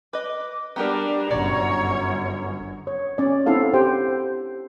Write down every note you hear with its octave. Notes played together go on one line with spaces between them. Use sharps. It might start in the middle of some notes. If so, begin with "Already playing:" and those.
B4 D#5 D6
G3 B3 D4 G4 A#4 A#5
G1 F#2 C#5 D5
C#5
C#4 D5
C4 D4 E4 A4 F5 F#5
G4 C5 G5